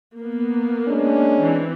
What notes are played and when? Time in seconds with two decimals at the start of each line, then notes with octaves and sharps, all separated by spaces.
0.18 A#3 B3
0.88 G#3 C#4 D4
1.44 E3 C4